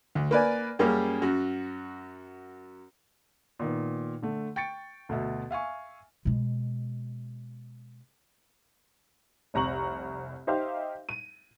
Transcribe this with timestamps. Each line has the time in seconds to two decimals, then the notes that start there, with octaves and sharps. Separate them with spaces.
0.15 D2
0.31 A#3 B4 D5 G#5
0.79 F#2 G3 A#3 C#4 G#4
1.22 F#2 F#4
3.59 A#2 D#3 B3
4.22 D3 A3
4.56 G5 C#6 A6 C#7 D7
5.09 D2 B2 E5
5.51 E5 F5 G#5 C#6
6.25 B2 G#3
9.54 F1 C2 A#5 C#6 F#7
10.47 D#4 G4 C5 E5 F5
11.09 D#7